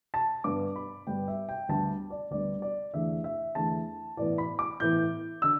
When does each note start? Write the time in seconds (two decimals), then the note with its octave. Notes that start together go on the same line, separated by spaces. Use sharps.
0.14 A5
0.44 G2 D3 G3 B3 D6
0.76 B5
1.07 G2 D3 G3 B3 G5
1.28 E5
1.49 G5
1.69 D2 D3 G3 B3 A5
2.10 D5
2.31 D2 D3 G3 B3 D5
2.62 D5
2.94 E2 D3 A3 E5
3.24 E5
3.55 E2 D3 A3 A5
4.17 A2 E3 B3 D5
4.38 B5
4.59 D6
4.80 A2 E3 B3 G6
5.42 D3 E6